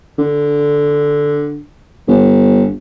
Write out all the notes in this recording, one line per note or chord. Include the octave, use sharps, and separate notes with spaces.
D3
G1